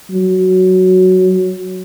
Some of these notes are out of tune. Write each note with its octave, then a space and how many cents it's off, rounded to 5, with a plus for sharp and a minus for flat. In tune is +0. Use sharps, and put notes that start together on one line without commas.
F#3 +5